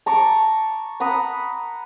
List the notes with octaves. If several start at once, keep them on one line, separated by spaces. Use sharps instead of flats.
A5 A#5 C#6 D6
F#5 A#5 B5 D#6